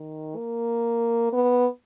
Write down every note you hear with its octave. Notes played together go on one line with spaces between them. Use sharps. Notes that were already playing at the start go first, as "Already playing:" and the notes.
Already playing: D#3
A#3
B3